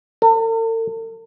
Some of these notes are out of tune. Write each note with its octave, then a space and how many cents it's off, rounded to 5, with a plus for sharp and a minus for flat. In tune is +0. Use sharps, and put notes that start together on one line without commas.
A4 +45